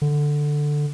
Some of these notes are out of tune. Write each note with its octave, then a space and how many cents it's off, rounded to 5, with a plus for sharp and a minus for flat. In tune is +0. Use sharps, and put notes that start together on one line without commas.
D3 +5